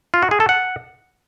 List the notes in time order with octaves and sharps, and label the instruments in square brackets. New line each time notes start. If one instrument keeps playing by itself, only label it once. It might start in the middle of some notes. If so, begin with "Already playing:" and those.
[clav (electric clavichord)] F4
F#4
G#4
A4
F#5